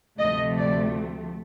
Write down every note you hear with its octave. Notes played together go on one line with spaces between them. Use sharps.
D2 C3 F3 A3 D#5
D5